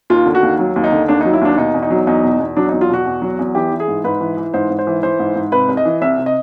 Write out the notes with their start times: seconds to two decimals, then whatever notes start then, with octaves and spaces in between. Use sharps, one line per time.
0.10 D#2 F4
0.26 D3
0.35 F#4
0.43 D#2
0.59 F#3
0.76 D#2
0.84 D#4
0.92 D3
1.08 D#2 D4
1.21 D#4
1.25 F#3
1.33 E4
1.41 D#2 D4
1.57 B2 D#4
1.74 E2
1.82 D#4
1.90 F#3
2.07 E2 D#4
2.23 B2
2.40 E2
2.57 F#3 D4
2.69 D#4
2.73 E2
2.81 F4
2.90 B2 F#4
3.06 E2
3.22 F#3
3.39 E2
3.55 E3 G4
3.72 E3
3.80 G#4
3.88 G#2
4.04 G#2 B4
4.21 E3
4.37 E3
4.54 G#2 C5
4.70 G#2
4.79 C5
4.87 E3
5.03 E3 C5
5.19 G#2
5.36 G#2
5.52 C3 B4
5.69 C2
5.77 D#5
5.85 E3
6.01 C2 E5
6.18 C3
6.26 D#5